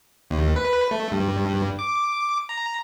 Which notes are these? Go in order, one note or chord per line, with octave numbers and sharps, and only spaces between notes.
D#2
B4
A3
G2
D6
A#5